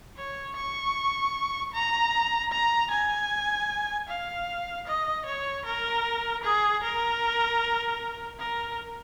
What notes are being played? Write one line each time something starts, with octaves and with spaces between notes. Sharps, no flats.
C#5
C#6
A#5
A#5
G#5
F5
D#5
C#5
A#4
G#4
A#4
A#4